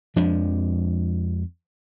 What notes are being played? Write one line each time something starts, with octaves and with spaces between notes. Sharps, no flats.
F2 F3 G#3 D4